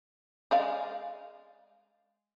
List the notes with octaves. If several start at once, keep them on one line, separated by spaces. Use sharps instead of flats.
G#3 D5 F5